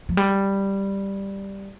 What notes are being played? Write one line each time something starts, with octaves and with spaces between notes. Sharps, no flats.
F3
G3